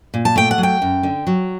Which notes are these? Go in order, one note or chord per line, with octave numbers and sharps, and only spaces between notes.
A#2
A5
A3 G5
F#5
F#3
G5
F#2
D3
F#3